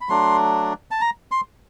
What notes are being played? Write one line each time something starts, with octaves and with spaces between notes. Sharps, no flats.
B5
F#3 A3 D4 C6
A5
A#5
C6